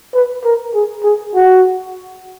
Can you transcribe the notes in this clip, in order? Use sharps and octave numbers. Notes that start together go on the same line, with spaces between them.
B4
A#4
G#4
G#4
F#4